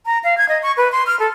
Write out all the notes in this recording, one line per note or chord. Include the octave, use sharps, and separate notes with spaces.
A#5
F5
G#6
D#5
C#6
B4
C6
F6
A4